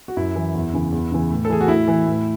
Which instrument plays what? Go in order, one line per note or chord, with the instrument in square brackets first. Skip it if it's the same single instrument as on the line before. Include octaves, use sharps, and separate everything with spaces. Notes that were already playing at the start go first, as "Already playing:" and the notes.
[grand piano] F#4
F#2 E4
E3
E2
C#3 E3
E2
C#3 E3
A2
A4
E3 G#4
F#4
A2 E4
E3
A2